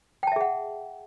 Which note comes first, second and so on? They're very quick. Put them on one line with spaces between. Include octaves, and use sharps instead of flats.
G5 A5 E5 G#4 F#5